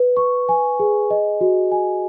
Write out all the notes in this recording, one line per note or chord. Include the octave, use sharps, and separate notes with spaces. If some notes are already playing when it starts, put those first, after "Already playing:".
Already playing: B4
C#6
G#5
G#4
D#5
F#4
G#5